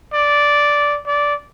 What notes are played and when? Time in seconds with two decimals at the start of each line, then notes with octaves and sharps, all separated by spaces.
0.13 D5
1.06 D5